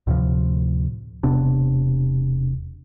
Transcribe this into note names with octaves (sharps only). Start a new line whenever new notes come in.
D2 A2 C3 F3
E1 C3 B3 D4